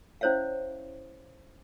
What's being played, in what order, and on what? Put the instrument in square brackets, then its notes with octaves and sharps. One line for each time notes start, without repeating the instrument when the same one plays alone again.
[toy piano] C#4 E4 C5 C#5 E5 F5